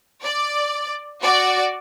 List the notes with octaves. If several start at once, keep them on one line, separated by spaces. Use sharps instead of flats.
D5
F#4 D5